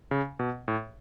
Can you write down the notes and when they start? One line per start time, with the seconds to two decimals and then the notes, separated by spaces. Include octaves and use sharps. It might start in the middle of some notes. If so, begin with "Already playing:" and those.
0.11 C#3
0.39 B2
0.68 A2